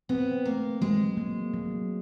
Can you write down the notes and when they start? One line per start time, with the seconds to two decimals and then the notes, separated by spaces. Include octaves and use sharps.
0.09 B3 C4
0.45 A3 A#3
0.81 F#3 G#3
1.17 A#3
1.54 F#3